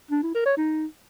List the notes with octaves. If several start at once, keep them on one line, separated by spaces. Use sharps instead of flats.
D4
E4
A#4
C#5
D#4